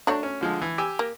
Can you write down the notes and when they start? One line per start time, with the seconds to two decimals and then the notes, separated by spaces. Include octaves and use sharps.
0.07 F#3 A3 D4 C#5
0.23 C#4
0.41 D3 F3 G#3
0.62 E3
0.78 G4 G#5 E6
0.99 A#3